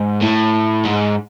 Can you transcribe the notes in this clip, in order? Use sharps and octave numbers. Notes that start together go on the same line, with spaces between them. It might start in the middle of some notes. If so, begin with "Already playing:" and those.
Already playing: G#2
A2
G#2